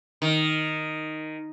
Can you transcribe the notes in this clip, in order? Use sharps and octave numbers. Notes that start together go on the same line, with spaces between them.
D#3